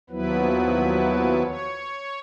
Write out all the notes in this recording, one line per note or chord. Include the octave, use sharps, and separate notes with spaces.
D#2 F3 F#3 B3 E4 B4
C#5